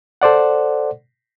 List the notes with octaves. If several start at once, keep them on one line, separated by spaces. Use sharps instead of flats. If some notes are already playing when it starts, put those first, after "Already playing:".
A4 C5 D5 F#5